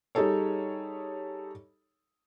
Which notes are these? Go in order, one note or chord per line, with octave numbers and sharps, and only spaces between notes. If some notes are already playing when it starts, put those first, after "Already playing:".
G3 D#4 G#4 A4 C#5